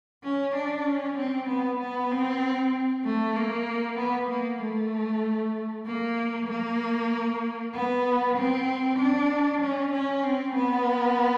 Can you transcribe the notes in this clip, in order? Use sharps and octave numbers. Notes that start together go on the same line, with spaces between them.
C#4
D4
C#4
C4
B3
B3
C4
A3
A#3
B3
A#3
A3
A#3
A#3
B3
C4
D4
C#4
C#4
C4
B3